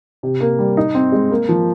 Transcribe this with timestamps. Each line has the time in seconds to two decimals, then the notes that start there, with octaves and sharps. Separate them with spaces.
0.23 C3
0.41 A#3
0.59 G3
0.77 D#4
0.95 C4
1.12 G#3
1.31 A#3
1.49 F3